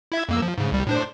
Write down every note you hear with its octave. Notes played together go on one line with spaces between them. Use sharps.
E4 E5 G#6
F2 A#3 E6
F3
G#2 C#3
C2 G3
A2 D4 C5